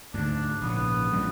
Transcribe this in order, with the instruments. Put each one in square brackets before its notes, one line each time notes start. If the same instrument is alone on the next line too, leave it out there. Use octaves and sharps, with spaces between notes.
[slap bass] D2 G#2 [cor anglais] D4
[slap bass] A#1 G#2 C#3 [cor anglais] B3
[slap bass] A1 G3 C4